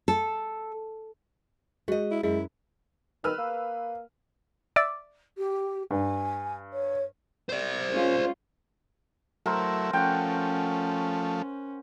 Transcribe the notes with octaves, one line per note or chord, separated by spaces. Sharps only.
A4
G#3 F#4 D#5
E4
F#2 G#3 E4
D#3 B4 E6 F6
A#3
D5 E5 E6
G4
G2 G#5
C#5
C5 D5
G#3 C#4 F4
F#3 A3 E4 A#4 C5
F3 A3 C#4 F#5 G5